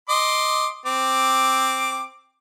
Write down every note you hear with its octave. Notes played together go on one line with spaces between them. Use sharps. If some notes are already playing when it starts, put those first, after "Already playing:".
D#5 C6 D6
C4 D6